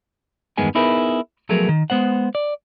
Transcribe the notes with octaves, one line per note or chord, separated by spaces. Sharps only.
E2 G2 D#3 G#3 B3 G#5
B3 D#4 E4 G#4 A#4 B4
F3 F#3 A3 B3 G#4 A#4
D#3
G#3 B3 C5 F#5
D5